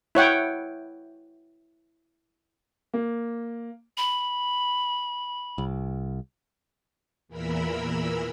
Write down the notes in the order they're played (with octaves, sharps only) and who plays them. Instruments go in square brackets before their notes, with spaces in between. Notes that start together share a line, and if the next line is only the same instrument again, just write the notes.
[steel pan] E4 C#5 F#5 G5
[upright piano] A#3
[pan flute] B5
[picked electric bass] C2
[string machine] E2 A#2 E3 A#4 B5 E6